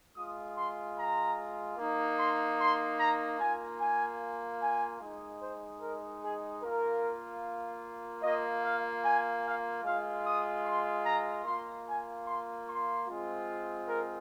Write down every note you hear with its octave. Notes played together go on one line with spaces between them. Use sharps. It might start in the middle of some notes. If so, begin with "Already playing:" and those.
G#3 F4 D#6
C6
A#5
A#3 D#4
C6
C6
A#5
A#3 F4 G#5
G#5
G#5
G#3 D#4
C5
A#4
G#4
A#3 F4 A#4
A#3 F4 D#5
F5
G#5
F5
G#3 F4 F5
D#6
C6
A#5
A#3 F4 C6
G#5
C6
C6
G#3 C4 F4
A#4